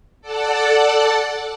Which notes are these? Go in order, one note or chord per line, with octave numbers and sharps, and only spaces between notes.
A4 D5 F#5 A5